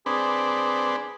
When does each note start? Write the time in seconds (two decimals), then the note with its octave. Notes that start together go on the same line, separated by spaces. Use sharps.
0.06 C4 D4 G#4 B4